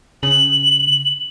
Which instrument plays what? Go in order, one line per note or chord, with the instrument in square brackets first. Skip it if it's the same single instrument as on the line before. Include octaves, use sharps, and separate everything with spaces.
[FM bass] C#3 [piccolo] F#7